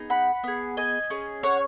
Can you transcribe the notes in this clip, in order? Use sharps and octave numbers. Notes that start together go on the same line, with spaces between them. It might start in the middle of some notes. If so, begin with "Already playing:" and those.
Already playing: B3 D#4 G#4
F#5 B5
B3 G#4
D#5 G#5
C#4 G#4
C#5 F#5